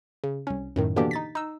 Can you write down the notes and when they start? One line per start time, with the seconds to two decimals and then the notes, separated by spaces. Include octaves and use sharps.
0.24 C#3
0.47 C2 C#4
0.76 F#2 A2 D#3
0.96 B2 D3 E3 A#3 D4 G4
1.11 D#4 A6 B6
1.35 D#4 E6